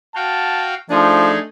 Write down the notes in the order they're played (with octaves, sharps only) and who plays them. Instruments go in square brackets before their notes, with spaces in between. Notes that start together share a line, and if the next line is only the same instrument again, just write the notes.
[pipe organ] F#4 F5 G5 [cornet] A5
[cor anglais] F3 [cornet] A3 [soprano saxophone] D4 [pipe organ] D#4 G#4